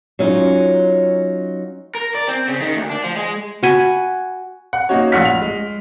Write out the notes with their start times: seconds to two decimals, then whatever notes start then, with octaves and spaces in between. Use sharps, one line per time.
0.19 F#3 C#4 D#4 F4
1.95 A#4
2.15 D5
2.28 C4
2.48 C#3
2.61 D#3
2.76 D2
2.90 D4
3.04 F3
3.16 G#3
3.63 F#4 G#5 B5
4.73 F#5
4.89 A#3 C#4 D#4 F#4 C#5
5.12 A#1 A2 F4 F#5 F6 B6
5.25 F7
5.42 G#3